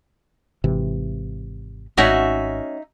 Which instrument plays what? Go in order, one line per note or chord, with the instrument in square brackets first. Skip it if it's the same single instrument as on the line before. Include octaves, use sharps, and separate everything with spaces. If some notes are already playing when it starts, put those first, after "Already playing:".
[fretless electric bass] G#1 C3 E3
[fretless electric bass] G#1 [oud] C#4 F#4 [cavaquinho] D#4 E5